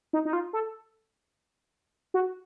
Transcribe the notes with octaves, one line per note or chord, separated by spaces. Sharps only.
D#4
D#4
F4
A4
F#4